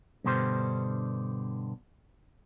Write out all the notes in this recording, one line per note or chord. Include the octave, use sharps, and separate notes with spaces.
G2 B2 D3 G4 C5